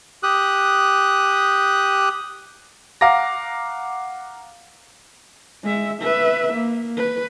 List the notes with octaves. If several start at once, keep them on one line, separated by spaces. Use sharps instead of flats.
G4 D#6 F#6
F5 F#5 A#5 D6 A#6
G#3 E5
B4 E5
A#3
B4